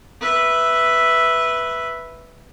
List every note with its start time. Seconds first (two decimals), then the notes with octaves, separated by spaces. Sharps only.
0.21 B4 E5